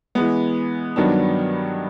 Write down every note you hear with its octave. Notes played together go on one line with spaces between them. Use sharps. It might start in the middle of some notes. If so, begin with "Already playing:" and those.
E3 G#3 B3
G2 D#3 F#3 B3 D4